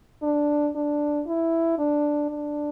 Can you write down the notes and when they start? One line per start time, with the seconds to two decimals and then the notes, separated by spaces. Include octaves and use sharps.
0.22 D4
0.75 D4
1.27 E4
1.78 D4
2.30 D4